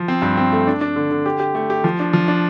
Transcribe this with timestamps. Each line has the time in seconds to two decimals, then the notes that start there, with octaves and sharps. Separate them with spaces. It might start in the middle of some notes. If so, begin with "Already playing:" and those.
Already playing: F3
0.08 C4
0.22 G2
0.37 C4
0.52 A3
0.67 D4
0.81 D4
0.96 D3
1.11 D3
1.26 G4
1.40 G4
1.55 A3
1.70 G4
1.84 F3
2.00 D4
2.13 F3
2.28 D4